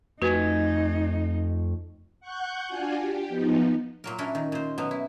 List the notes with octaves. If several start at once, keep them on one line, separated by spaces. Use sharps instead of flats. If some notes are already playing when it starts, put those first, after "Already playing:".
F2 A3 D#4 F#4 B4 G#5
F#5 C#6 F#6 G6
D4 F4 F#4 G#5
G4
F3 B3 D#4
A#2 F#3 A#4
C#4 D4 E4 F#4 A#4
D#3
A#2 C5
B2 F#3 B3 C#4
E4